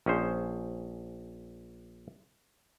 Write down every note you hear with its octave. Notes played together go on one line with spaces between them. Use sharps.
A#1 C#4 G#4 C5